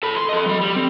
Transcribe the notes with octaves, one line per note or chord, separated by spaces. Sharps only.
A4 B5
C6
A4 D#5
F#3 B5
G3
C4